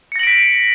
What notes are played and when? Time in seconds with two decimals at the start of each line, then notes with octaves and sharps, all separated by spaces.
0.12 C#7
0.16 A#6
0.19 F#7
0.23 D7
0.27 B6